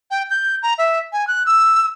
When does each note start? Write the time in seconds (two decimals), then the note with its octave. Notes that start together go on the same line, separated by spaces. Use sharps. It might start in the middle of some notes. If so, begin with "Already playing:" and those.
0.11 G5
0.30 G6
0.63 A#5
0.78 E5
1.13 G#5
1.27 F#6
1.46 E6